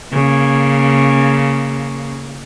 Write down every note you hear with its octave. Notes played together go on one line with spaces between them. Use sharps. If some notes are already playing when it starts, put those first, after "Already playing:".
C#3 A#3